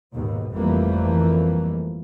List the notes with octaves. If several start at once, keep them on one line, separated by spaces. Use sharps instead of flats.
D#2 G#2 B2
G1 F2 E3 G3 A3 A#3